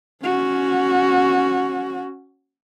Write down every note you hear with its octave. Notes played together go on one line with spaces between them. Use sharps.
C#4 F#4